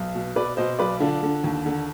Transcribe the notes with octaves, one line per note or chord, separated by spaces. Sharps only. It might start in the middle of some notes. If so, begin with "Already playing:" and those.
Already playing: B1
B2
B2 B4 D5
B2 C5 D#5
B1 B4 D5
D3 D4 F4
D3
D#2
D3